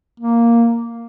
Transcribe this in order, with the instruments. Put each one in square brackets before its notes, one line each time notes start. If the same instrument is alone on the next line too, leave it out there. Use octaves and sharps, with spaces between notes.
[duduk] A#3